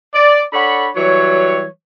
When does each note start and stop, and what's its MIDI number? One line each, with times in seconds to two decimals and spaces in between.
0.14 0.43 74
0.53 0.89 62
0.53 0.89 69
0.53 0.89 73
0.53 0.89 78
0.53 0.89 83
0.96 1.65 52
0.96 1.65 54
0.96 1.65 55
0.96 1.65 73